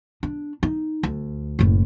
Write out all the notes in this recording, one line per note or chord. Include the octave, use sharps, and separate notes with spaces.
D4
D#4
D2
F#1 A2